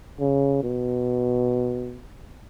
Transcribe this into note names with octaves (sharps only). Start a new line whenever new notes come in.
C#3
B2